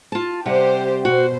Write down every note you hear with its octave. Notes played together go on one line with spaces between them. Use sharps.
F4 A5
C3 G3 G4 C5 F#5
B2 F#4 C5